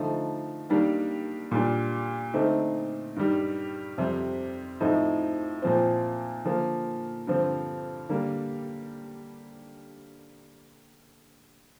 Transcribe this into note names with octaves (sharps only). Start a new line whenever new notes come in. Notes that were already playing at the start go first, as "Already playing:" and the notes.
Already playing: D3 F3 A3 D#4
D#3 G3 A#3 D4
A#2 G3 D4
D3 A3 C4 D#4
G2 D#3 G3
F2 C3 G3
A2 F3 C4 D#4
A#2 F3 C4
D3 F3 A#3
G2 D3 F3 C4
D3 G3 A#3